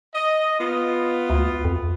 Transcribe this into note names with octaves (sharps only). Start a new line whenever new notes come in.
D#5
B3 F4
D2
F2